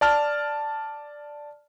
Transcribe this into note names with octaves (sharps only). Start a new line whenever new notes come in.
D5 A5 F6